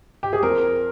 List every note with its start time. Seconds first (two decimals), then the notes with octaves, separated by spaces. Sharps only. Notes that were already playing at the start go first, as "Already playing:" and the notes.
0.23 G4
0.33 G#4
0.43 F2 A#4